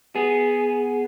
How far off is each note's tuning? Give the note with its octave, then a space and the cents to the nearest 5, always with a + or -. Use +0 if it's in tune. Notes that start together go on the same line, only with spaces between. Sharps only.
B3 +0 G#4 +0